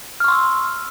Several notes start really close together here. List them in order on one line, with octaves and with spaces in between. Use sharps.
F6 C#6 C6 E6